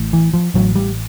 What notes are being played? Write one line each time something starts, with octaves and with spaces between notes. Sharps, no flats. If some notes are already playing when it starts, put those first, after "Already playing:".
Already playing: A1 A2
E3
F3
A1 A2 F#3
G3